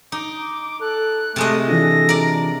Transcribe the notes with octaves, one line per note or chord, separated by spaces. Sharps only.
D#4 D6
A4 F#6
C3 G#3 A3 D#5
E3 D4 F4 A4 A#6
A#4 D5